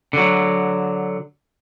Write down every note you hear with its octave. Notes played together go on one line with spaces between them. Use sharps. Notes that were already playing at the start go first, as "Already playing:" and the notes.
D3 F#3